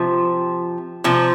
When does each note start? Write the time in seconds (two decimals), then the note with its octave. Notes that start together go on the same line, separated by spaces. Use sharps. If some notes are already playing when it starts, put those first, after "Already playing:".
Already playing: C3 F3
1.04 C3 F3